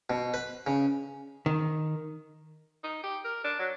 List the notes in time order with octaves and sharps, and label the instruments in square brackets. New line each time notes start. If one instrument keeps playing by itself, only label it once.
[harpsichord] B2
B4
C#3
[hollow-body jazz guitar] D#3
[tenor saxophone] D#4
G4
A#4
D4
F#3